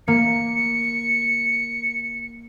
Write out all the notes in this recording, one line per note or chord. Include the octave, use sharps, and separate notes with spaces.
A#3 C#7